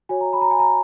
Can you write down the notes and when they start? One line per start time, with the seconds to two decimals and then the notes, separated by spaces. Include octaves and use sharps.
0.09 F#4 C#5 G#5
0.21 A#5
0.33 B5
0.41 A#5
0.51 G#5
0.59 A#5